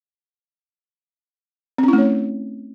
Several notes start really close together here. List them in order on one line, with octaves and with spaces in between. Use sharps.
C4 C#4 E4 A3 C#5